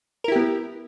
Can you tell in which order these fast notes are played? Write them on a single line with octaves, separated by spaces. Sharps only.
A#4 E4 G4 B3